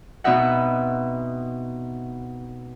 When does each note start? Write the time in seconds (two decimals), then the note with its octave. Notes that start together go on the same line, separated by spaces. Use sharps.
0.24 B2 B3 C4 D#4 E5 F#5